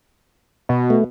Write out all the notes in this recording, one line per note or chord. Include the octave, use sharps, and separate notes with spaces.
B2
A3